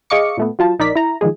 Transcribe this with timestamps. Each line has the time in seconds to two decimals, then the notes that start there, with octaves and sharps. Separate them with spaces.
0.10 G#4 D#5 F5 C#6 D6 C#7
0.37 A#2 A3 B3
0.59 F#3 F4 A5
0.79 A#1 D#4 A#4 D5 B6
0.95 E4 A#5
1.21 D#3 F3 G#3 G#4